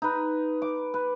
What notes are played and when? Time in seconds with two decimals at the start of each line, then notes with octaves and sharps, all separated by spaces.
0.02 D#4 B4
0.62 D6
0.94 B4